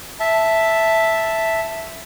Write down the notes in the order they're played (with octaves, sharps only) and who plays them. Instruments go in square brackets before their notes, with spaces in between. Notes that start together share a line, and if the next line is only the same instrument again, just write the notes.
[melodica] E5 A5